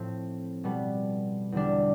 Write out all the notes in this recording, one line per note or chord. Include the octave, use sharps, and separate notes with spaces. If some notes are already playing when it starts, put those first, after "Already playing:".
Already playing: A2 F3 A3 C4
B2 G3 B3
E2 D3 G3 D4